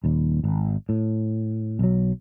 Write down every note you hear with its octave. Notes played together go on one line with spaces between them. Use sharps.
D#1 D#2
G#1
A2
B1 F#3